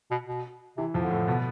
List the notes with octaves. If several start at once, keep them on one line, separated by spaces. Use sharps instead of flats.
B2
B2
C3 E3
F2 F3
D3
A2 A3
B2 B3